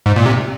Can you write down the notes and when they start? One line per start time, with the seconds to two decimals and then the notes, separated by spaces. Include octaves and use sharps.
0.06 G#2
0.16 A#2
0.26 C3